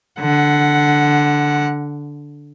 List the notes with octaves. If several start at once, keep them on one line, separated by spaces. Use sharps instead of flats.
D3 F#5